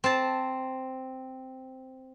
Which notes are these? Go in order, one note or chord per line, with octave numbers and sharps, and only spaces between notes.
C4 A5